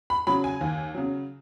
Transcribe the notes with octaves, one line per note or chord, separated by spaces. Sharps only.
B5
C#3 F#3 B5
G#5
D#2
C#3 F#3